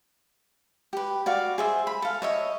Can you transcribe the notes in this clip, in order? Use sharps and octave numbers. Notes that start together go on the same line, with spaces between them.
G4 B4
F#4 D5 F5
G#4 C5 E5
B5
A4 F5
C#5 D#5 E5